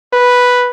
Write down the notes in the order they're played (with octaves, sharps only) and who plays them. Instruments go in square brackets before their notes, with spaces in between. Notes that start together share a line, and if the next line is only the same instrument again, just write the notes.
[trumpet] B4